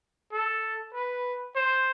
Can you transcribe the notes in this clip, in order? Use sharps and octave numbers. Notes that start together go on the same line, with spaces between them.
A4
B4
C5